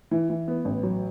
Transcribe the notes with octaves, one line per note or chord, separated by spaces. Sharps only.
E3
E3
B3
A1
F#3